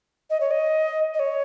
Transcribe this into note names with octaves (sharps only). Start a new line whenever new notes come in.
D#5
C#5
D#5
D#5
C#5